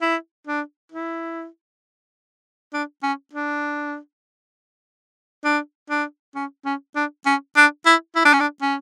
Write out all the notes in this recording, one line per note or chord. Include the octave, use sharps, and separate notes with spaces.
E4
D4
E4
D4
C#4
D4
D4
D4
C#4
C#4
D4
C#4
D4
E4
E4
D4
C#4
D4
C#4